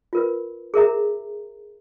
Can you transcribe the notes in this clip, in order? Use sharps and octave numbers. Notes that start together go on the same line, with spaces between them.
F4 A#4 B4
G#4 A#4 E5 A#5